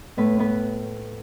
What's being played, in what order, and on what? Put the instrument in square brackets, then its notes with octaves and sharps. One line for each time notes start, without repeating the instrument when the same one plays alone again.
[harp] A2 B3 B4
B3 B4